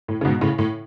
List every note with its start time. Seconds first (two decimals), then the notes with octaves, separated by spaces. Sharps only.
0.08 A2
0.21 C#3
0.25 G#2 B2
0.41 A2 C#3
0.58 A2